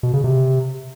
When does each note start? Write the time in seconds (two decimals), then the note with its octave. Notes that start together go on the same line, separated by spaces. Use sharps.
0.03 B2
0.14 C#3
0.24 C3